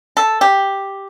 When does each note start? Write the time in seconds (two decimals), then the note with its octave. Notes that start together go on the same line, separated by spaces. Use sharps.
0.17 A4
0.41 G4